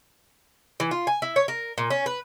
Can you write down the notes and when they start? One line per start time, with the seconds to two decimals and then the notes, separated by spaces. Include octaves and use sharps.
0.80 E3
0.91 F4
1.07 G#5
1.22 E4
1.36 C#5
1.48 A#4
1.78 A#2
1.90 C#4
2.06 B4